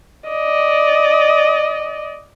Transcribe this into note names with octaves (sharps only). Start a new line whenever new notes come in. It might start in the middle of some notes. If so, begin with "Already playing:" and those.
D5 D#5